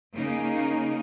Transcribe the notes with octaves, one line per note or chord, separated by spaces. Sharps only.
C#3 A#3 D#4